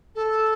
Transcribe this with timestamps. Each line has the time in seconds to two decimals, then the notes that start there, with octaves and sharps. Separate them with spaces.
0.15 A4